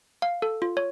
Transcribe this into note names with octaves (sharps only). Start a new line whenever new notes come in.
F5
A4
F4
C#5